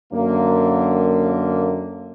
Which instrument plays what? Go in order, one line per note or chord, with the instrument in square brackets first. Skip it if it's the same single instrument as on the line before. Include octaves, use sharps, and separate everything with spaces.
[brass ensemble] F#2 D3 A#3